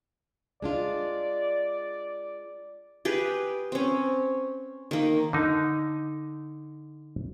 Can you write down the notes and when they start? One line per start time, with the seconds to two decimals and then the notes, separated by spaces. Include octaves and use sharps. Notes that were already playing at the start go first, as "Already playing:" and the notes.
0.62 G#3 D4 F4 D5
3.05 G4 G#4 B4
3.72 C4 C#4
4.91 D#3 A#3
5.33 D3 D#4